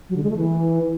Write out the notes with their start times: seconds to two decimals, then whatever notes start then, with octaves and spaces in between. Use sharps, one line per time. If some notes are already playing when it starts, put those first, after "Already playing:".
0.09 F#3
0.16 D3
0.23 G#3
0.30 A3
0.37 E3